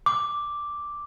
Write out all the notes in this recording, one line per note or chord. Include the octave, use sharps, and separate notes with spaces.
D6